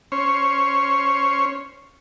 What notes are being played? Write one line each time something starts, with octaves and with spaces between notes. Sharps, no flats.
C#4 C5 C#5